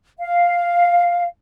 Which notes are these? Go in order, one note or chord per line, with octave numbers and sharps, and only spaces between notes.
F5